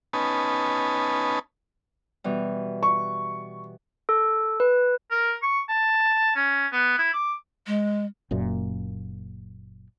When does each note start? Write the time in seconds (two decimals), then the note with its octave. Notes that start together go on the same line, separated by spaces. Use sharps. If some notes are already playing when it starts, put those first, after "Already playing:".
0.13 B3 C#4 D#4 B4 G#5 A5
2.24 B2 E3 G3
2.83 C#6
4.09 A4
4.60 B4
5.11 A#4
5.43 C#6
5.69 A5
6.35 C#4
6.72 B3
6.98 E4
7.14 D6
7.67 G#3
8.31 F#1 F#2 A#2